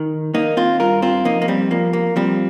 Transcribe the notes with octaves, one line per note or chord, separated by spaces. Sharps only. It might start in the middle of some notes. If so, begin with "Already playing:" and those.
Already playing: D#3
D#3 A#3 D#4
C4 F4
G2 F4 A#4
C4 F4
F2 A#3 D#4
A#3
G3 C4
F3 A#3
A#3
F3 G3 C4